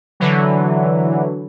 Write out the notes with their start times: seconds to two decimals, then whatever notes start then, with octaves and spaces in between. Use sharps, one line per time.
0.20 D3 E3 F#3